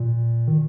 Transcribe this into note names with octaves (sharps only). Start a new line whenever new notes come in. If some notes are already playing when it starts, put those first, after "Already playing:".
Already playing: A#2
D#3